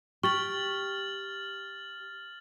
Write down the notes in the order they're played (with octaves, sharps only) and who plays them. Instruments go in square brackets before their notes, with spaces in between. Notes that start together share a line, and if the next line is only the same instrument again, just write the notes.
[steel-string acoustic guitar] G4 [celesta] C#6 [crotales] F6 A6 F#7